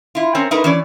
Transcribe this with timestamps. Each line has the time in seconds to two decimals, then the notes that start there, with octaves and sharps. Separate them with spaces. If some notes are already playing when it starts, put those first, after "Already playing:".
0.15 E4 F4
0.35 C4 C#4 A#4
0.51 A3 D#4 E4 A#4 B4
0.64 E3 C#4 D5